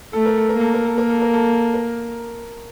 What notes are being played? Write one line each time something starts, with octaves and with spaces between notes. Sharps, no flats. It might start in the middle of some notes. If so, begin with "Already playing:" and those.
A3 A4
A#4
A4
A#3 A#4
A4
A#4
A4
A#3 A#4
A4
A#4
A4
A#4